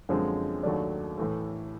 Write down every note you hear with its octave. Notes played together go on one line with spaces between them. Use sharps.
F#2 D3 F3 G#3 C4
D#2 D#3 F#3 A3 D4
A2 E3 A3